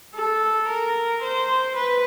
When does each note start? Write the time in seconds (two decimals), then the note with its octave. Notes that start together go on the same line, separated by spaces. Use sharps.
0.14 A4
0.68 A#4
1.22 C5
1.76 B4